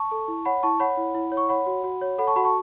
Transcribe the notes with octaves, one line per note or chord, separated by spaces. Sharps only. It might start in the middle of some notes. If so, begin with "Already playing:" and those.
Already playing: A5 C#6
A4
E4
C#5 F#5 B5
E4 A5 C#6
C#5 F#5 B5
E4
E4
C#5
C#6
C#5 F#5 B5
F#4
F#4
C#5
A4 F#5 B5
A5 C#6
F#4 F#5 B5
A5 C#6